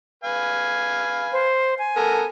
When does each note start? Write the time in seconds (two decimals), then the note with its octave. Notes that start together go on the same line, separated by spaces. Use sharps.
0.24 B4 F5 G#5
1.32 C5
1.78 G#5
1.96 B3 A4 A#4